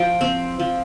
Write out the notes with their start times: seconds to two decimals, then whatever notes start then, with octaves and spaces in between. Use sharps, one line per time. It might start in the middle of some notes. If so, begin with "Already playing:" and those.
Already playing: F3 G5
0.21 C4
0.59 F3